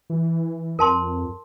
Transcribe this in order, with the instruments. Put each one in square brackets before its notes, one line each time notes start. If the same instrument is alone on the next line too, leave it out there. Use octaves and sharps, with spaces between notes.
[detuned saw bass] E3
[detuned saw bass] F2 [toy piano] A#4 A5 C6